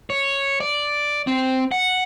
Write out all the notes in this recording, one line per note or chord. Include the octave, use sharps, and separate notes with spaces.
C#5
D5
C4
F#5